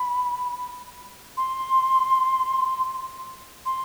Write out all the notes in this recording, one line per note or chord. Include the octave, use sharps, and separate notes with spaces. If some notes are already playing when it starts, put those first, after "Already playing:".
Already playing: B5
C6
C6